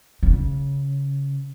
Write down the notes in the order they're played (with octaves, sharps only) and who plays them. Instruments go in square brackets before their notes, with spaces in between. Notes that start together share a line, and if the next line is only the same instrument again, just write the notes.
[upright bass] C#3